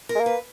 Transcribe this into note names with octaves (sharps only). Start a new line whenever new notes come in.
A#4
G#3
A#3
B4